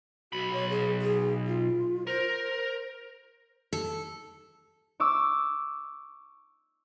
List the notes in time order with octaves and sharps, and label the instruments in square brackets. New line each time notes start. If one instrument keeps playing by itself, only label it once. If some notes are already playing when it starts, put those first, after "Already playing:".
[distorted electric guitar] B1 B5 [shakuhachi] F#4
[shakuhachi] C#5
G#4
G#4
F4
[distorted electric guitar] A#4 [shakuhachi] C5
[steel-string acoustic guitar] A4
[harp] C#6 D6 E6